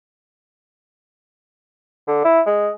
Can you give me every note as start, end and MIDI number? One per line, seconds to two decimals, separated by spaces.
2.07 2.21 50
2.25 2.41 64
2.46 2.70 56